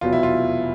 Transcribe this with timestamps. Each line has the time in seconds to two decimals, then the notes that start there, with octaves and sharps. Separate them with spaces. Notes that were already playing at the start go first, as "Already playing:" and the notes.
0.01 F1 E2 B2 F#3 B3 F4
0.13 E4
0.23 F4